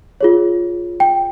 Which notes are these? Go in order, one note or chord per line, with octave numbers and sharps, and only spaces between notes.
F4 G#4 C#5
G5